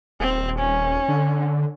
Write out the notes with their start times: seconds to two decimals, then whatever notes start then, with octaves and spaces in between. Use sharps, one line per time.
0.20 D#1 C4
0.59 C#4
1.08 D3